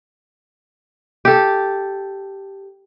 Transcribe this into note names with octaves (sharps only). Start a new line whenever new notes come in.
G4 A4